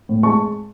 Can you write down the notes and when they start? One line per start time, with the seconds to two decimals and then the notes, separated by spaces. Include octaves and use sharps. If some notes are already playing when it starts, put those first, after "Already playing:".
0.09 A2
0.23 G#3 A5 C#6